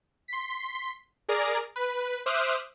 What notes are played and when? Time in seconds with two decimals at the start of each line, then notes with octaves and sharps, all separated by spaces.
0.28 C6 B6
1.29 G#4 A#4 D5 A#5
1.76 B4
2.26 C5 E5 D6 D#6 F6 F#6